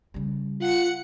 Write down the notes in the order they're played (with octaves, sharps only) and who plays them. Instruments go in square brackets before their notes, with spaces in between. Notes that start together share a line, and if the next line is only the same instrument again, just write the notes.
[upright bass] C#3 G3
[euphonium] F4 [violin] F#5 C#7